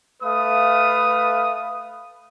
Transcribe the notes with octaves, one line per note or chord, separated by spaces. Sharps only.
A3 B4 F5 D#6